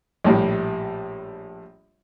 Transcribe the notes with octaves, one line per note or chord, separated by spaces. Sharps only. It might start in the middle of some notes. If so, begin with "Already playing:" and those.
A#1 A2 G3